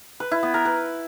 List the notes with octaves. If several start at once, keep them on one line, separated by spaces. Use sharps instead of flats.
B4
E4
B3
A#4
B4